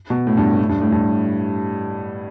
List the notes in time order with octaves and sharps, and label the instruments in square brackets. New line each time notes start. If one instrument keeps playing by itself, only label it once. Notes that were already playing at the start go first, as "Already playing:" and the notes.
[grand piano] B2
A2
G2
A2
A2
G2
A2
G2